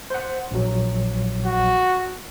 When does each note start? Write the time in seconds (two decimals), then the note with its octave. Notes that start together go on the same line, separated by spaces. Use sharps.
0.10 C5 F#5
0.51 A#1 F#3
1.45 F#4